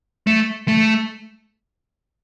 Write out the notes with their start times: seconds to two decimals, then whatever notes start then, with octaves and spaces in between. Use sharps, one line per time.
0.27 A3
0.68 A3